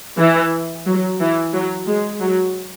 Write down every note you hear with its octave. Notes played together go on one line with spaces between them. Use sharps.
E3
F#3
E3
F#3
G#3
F#3